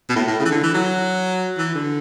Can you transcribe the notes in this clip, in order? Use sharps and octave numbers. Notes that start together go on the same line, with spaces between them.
B2
A2
A2
C#3
E3
D3
E3
F#3
E3
D3